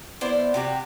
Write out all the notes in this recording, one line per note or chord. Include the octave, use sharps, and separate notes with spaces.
B3 E4 C5 D5
C3 F#4 G4